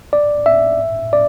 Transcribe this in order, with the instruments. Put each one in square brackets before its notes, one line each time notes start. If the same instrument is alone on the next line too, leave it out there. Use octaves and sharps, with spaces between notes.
[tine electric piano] D5
E5
D5